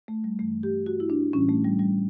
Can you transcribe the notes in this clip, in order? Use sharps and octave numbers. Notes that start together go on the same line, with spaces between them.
A3
G3
G2 E3 G3 A3
G4
F#4
E4
D4
A2 E3 G3 C#4
A3
G3
G3